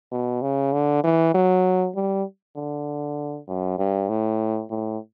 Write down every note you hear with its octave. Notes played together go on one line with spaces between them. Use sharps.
B2
C#3
D3
E3
F#3
G3
D3
F#2
G2
A2
A2